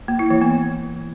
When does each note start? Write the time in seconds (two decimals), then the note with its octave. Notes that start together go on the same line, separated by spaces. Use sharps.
0.08 A#3
0.19 E4
0.30 E3
0.41 B3